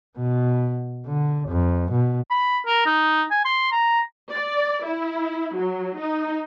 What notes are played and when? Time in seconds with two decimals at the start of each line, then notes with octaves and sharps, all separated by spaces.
0.18 B2
1.07 D3
1.49 F2
1.92 B2
2.30 B5
2.66 A#4
2.86 D#4
3.31 G#5
3.45 C6
3.72 A#5
4.30 D5
4.85 E4
5.55 F#3
5.98 D#4